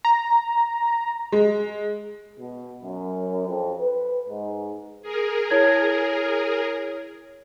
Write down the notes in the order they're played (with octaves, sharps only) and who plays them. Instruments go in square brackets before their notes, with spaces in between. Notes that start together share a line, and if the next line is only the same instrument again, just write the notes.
[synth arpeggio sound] A#5
[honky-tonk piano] G#3
[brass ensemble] B2
F#2
F2
B4
G#2
[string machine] G#4 A#4
[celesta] E4 C#5 G#6